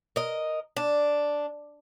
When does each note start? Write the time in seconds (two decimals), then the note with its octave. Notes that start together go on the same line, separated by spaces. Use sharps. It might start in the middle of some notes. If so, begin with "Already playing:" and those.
0.16 A#4 D#5
0.77 D4